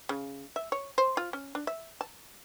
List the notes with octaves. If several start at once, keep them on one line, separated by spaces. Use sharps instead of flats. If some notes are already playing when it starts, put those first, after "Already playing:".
C#3
E5
C#5
C5
F4
C#4
D4
E5
A5